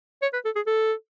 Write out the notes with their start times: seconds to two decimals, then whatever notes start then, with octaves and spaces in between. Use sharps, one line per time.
0.22 C#5
0.33 B4
0.45 A4
0.56 G#4
0.66 A4